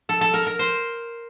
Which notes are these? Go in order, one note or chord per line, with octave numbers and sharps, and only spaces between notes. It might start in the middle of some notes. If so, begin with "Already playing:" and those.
A4
A4
A#4
A#4
C5